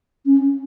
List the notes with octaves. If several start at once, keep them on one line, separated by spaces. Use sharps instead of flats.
C#4